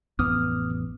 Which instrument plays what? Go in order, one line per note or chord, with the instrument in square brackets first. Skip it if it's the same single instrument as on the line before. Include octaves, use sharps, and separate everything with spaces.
[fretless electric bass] A1 F2 B3 [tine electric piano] D6 D#6 F6